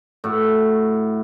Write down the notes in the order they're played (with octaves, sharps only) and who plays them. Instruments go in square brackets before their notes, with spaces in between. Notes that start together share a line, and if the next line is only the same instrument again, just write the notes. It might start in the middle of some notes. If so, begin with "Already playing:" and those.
[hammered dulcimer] A2 F#4